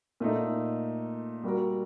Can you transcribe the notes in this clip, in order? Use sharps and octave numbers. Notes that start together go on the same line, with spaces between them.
A#2 A3 D#4
G3 A#3 F#4 A#4